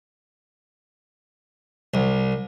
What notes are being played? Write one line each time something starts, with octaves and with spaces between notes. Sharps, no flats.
C2